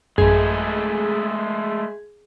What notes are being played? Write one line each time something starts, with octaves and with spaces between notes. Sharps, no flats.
A1 F#2 G#3 A3 G#4 B4